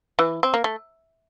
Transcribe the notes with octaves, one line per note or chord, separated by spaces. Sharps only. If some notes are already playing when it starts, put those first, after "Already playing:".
E3
C4
A#3
A3